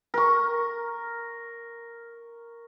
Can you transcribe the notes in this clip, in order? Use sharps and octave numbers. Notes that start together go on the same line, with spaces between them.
A#4 C#6